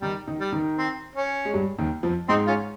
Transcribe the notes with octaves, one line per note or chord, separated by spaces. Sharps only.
D#3 G3 D#4
D#3 D#4
G3
D#3 D#4
C4
C#4
G#3
G2 G3
D#2 D#3
F2 F3
G#2 G#3 C4 D#4
C#4 F4